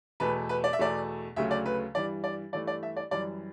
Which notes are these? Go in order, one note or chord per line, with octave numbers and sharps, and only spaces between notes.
E2 B2 A3 B4
B4
D5
E5
E2 B2 A3 D5
D2 C#3 F#3 A3 E5
D5
B4
G2 E3 G3 D5
D5
G2 E3 A3 D5
D5
E5
D5
F#2 E3 G3 D5